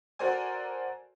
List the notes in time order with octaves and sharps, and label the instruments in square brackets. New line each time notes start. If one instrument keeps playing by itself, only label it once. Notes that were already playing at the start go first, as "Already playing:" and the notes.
[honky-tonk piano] F#4 A4 A#4 C5 D5 G#5